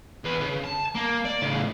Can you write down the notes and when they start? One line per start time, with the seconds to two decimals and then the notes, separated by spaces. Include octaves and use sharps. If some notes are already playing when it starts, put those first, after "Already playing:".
0.24 E2 B4
0.41 C#3
0.64 A5
0.95 A#3
1.25 D5
1.42 A2 C#3